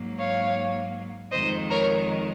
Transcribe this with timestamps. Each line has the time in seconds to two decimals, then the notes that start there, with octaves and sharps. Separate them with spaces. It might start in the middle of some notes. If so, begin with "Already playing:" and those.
Already playing: G#2 F#3 A#3
0.19 C#5 F5
1.31 F2 D#3 G#3 C5 D#5
1.70 A#4 C#5